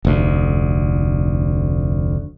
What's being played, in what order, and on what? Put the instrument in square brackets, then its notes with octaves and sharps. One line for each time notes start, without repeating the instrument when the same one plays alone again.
[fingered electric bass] F1 D2